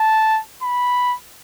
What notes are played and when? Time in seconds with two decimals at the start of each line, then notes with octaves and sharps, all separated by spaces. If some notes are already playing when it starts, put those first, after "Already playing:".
Already playing: A5
0.63 B5